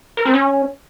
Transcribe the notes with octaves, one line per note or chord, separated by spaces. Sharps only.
A#4
C4
C#4